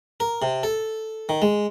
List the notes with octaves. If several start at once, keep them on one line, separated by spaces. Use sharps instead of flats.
A#4
C3
A4
D#3
G#3